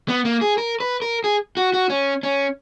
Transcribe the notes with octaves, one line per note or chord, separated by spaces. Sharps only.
B3
A#3
G#4
A#4
B4
A#4
G#4
F#4
F#4
C#4
C#4